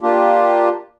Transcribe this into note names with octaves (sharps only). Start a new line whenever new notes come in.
A#3 D4 F4 G4